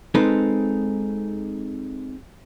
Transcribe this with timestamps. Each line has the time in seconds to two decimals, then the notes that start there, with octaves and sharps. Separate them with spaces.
0.15 G#3 C4 D#4 A4 B4